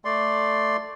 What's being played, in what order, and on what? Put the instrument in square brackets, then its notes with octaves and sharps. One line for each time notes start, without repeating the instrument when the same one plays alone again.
[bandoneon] A3 D5 C6